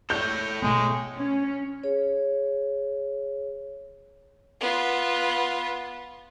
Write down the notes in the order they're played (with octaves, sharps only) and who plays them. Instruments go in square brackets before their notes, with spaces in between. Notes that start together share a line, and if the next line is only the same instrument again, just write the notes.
[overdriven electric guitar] A4 C#5 [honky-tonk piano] G6
[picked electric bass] B2 A3 B3 [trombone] G#3
[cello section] C#4
[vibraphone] G#4 C#5
[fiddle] B3 F4